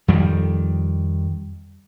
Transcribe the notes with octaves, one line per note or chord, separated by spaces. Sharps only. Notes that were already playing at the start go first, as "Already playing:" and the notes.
F2 D#3 G3